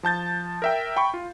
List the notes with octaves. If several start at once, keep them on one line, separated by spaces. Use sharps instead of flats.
F3 A5 G6 A6
A#4 E5 G5
G5 B5 C#6
F4